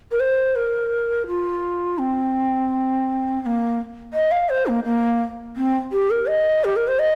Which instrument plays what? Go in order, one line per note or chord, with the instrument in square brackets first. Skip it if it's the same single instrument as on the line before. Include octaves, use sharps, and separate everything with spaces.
[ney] A#4
C5
A#4
F4
C4
C4
A#3
D#5
F5
C5
A#3
A#3
C4
G4
A#4
D#5
G4
A#4
C5
D#5